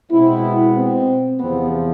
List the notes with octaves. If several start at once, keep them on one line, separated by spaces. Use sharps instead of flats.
B2 G#3 B3 C4 E4
C4
E2 C3 F3 B3 C4